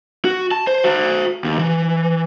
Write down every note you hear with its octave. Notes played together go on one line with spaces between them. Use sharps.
F#4
A5
C5
F#4 C5
D#2
E3